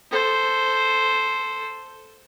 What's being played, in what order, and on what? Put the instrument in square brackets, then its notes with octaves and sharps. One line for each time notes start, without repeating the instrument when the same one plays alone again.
[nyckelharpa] A4 C5